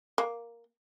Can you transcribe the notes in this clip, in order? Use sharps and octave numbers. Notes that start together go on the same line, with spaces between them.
A#3